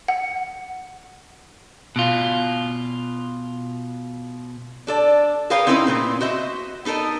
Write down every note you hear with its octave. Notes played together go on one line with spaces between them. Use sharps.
F#5
B2 F4
D4 A4 D5
G#4 A#4 B4 C#5 F5 G5
C4 C#4 D#4 E4 A#4 B4
A#2 B3 C4
F#4 C5 D#5 E5
B3 D#4 A4 A#4 D#5